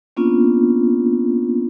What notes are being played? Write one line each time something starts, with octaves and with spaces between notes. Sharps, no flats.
A#3 B3 C#4 D4 F4